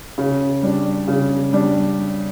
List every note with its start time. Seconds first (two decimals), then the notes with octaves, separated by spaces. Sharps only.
0.18 C#3
0.63 G3 D4
1.07 C#3
1.53 G3 D4